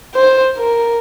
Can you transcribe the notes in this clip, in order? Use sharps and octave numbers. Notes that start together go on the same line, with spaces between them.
C5
A#4